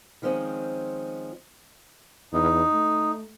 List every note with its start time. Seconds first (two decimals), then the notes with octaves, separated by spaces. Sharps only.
0.22 D#3 F3 G#3 C4 C#4
2.33 E2 D#4
2.73 A3